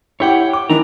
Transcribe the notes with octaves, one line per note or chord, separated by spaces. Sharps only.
E4 G4 C#5 F#5 G5
D6
D#3 E3 D4 E4 A#5